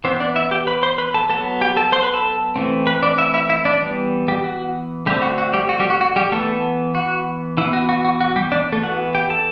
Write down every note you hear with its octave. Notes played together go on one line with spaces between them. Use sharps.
E3 B3 C4 C5
D4 D5
E4 E5
G4 G5
B4 B5
C5 C6
B4 B5
A4 A5
F#3 B3 A4 A5
G4 G5
A4 A5
C5 C6
B4 B5
A4 A5
E3 A3 C4
B4 B5
D4 D5
E4 E5
E4 E5
E4 E5
D4 D5
E3 G3 B3
G3 G4
F#4
D3 G3 A3 C4 G4
F#4
F#4
G3 G4
F#4
G3 G4
F#4
F#4
G3 G4
E3 A3 B3 A4
F#4
E3 B3 E4
F#4
F#4
F#4
F#4
G3 G4
D4 D5
A3 A4
E3 B3 F#4 F#5
G4 G5
A4 A5